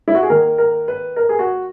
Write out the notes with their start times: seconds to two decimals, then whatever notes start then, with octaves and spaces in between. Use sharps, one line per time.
0.08 E4
0.15 F#4
0.23 G#4
0.30 D#3 A#3 A#4
0.58 A#4
0.88 B4
1.16 A#4
1.29 G#4
1.39 F#4